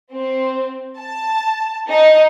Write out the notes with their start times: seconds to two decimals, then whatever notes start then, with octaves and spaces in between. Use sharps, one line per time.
0.11 C4
0.97 A5
1.87 D#4